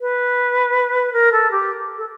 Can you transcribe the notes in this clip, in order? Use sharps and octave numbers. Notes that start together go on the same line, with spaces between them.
B4
A#4
A4
G4
A4